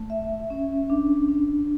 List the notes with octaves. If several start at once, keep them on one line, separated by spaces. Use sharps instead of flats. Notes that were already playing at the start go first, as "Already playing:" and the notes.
Already playing: A3
E5
C#4
D4
D4